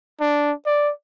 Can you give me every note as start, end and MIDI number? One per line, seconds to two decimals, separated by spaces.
0.21 0.53 62
0.66 0.91 74